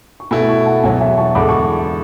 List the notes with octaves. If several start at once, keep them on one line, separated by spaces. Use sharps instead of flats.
C#6
B2 A3 E4 G#5 B5
A5 C#6
F#5 A5
E2 B2 F#3 E5 G#5
E5 G#5
A5 C#6
E2 D3 G#3 B5 D6
A5 C#6